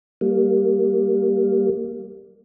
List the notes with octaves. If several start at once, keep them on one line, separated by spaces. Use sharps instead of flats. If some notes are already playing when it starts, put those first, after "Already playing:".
G3 A#3